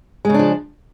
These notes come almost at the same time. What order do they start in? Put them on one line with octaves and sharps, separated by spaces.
G#3 C#3 D4 F3